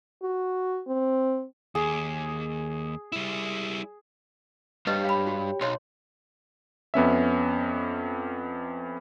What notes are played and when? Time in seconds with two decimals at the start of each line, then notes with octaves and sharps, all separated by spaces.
0.23 F#4
0.87 C4
1.75 D#2 G#4
3.12 G3 E4
4.87 G2 G4 B4 C#5 D#5 G5
5.05 F5 B5
5.27 F#4 B5
5.61 B1 C#5 C6
6.94 F2 B3 C#4 E5